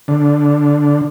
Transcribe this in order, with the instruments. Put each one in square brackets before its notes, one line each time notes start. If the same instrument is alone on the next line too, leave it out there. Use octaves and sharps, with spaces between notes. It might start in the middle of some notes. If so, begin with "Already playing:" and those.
[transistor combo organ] D3